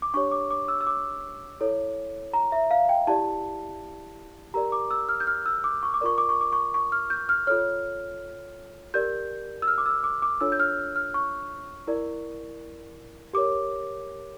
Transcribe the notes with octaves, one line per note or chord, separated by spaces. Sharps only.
D6
D4 G4 C#5 C#6
D6
D6
E6
E6
D6
E4 A4 C#5
A#5
E5
F5
G5
E4 G4 D5 A5
G4 A#4 D5 A#5
D6
E6
F6
G6
F6
E6
D6
C#6
D6
F4 A#4 D5 C#6
D6
C#6
D6
C#6
C#6
F6
G6
F6
F4 A4 C#5 F6
G4 A#4 D5 G6
E6
F6
D6
E6
D6
D6
D4 F4 A4 C#5 E6
G6
F6
F6
C#6
E4 A#4 D5
G4 A#4 C#5 D6